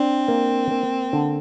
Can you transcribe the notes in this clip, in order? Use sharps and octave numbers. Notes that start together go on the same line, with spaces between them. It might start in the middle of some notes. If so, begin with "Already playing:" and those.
Already playing: C4 D4
A#3
A#3
D3